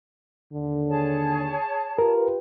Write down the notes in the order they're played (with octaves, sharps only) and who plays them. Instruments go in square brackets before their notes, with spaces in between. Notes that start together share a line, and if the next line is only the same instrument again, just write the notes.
[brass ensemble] D#2 D3
[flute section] G#4 C#5 A5
[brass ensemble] F4 G4 B4 [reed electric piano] A#4